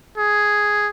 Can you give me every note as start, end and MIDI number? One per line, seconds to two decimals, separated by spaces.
0.17 0.89 68